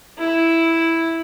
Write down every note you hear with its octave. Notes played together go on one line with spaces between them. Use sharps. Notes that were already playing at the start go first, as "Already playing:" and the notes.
E4